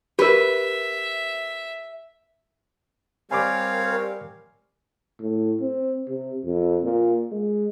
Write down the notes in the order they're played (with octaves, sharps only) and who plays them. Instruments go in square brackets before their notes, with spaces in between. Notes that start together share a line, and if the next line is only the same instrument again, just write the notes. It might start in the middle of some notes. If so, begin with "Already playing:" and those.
[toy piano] G4 A#4 [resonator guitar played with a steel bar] B4 [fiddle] E5
[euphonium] G3 [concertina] C4 C#5 F5 [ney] A#4 [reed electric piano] G#5 B5 D6
[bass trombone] A2
C4
C3
F2
A#2
G#3